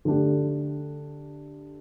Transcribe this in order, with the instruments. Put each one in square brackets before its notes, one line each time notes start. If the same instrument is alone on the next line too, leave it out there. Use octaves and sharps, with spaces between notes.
[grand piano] D3 A3 D4 G4